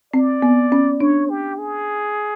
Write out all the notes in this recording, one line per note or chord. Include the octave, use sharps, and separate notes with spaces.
C4 D5
B3
C#4
D4 C#5
G4
G#4